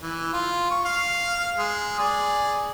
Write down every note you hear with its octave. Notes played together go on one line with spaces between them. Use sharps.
E3
F4
C#6
F5
G#3
G#4 D5